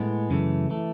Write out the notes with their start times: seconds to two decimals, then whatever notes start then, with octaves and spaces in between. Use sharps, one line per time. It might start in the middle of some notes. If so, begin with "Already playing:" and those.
Already playing: A2 G#3 B3
0.30 F#2 C#3 E3 A3
0.70 E3 A3